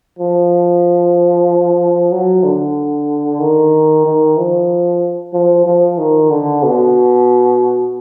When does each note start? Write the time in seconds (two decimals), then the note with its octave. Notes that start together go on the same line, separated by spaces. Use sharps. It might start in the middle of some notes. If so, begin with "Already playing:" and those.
0.19 F3
2.12 F#3
2.44 D3
3.40 D#3
4.05 D#3
4.38 F3
5.33 F3
5.65 F3
5.98 D#3
6.30 D3
6.63 B2